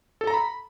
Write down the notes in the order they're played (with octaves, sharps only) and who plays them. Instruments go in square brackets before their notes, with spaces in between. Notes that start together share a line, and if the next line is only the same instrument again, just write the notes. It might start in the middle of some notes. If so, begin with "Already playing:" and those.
[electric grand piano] A4
A#5
B5